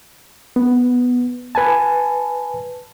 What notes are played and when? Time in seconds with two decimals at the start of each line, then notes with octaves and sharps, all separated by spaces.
0.56 B3
1.55 B4 G#5 A5